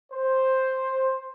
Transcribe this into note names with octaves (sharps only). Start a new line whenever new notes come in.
C5